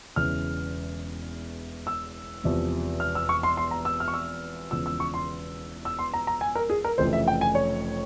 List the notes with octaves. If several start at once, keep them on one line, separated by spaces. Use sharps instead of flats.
E1 E2 C#3 E3 F6
E6
E1 E2 C3 F3
F6
E6
C#6
C6
C6
A#5
E6
F6
C#6
E6
E1 E2 C#3 F3 E6
E6
C#6
C6
E6
C6
A#5
A#5
G#5
A#4
G#4
A#4
F1 F2 C#3 E3 C5
E5
G5
G#5
C#5